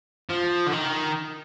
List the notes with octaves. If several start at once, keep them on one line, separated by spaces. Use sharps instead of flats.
F3
D3
D#3